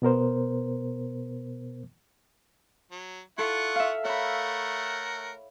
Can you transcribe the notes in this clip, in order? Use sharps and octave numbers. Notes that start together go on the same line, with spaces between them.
B2 B3 A#4 C5
F#3
E4 F4 A4 F#5 C#6
E5 F5
A3 A#4 C#5 F#5 B5